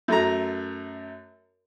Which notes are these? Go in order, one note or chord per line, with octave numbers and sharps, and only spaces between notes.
F#2 A3 A#5